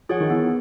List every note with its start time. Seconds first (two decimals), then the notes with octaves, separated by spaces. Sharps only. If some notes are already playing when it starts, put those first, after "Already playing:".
0.09 F3 G#4 C#5 F#5
0.20 D#3
0.30 E3 B3